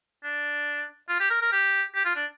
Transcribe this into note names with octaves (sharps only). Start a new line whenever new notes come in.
D4
F4
G4
A#4
A#4
G4
G4
F4
D4